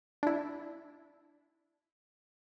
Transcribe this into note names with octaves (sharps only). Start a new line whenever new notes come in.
D4 E4